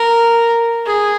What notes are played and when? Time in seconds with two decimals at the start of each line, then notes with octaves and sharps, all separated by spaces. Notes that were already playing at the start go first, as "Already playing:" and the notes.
Already playing: A#4
0.86 G#4